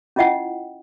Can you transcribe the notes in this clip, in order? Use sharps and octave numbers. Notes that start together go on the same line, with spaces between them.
C#4 E4 F4 D#5 F#5 G5